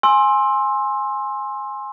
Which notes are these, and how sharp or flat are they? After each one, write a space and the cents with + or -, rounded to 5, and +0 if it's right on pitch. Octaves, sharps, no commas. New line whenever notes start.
G#5 +0 C6 +20 E6 +0